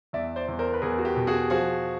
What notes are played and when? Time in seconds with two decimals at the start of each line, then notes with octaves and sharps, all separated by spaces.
0.13 E2 D5 E5
0.36 C5 D5
0.48 E2
0.59 A#4 C5
0.74 B4
0.82 E2 G#4 A#4
0.98 F#4
1.05 G4
1.16 B2
1.27 F#4 G#4
1.50 F3 F#4 G#4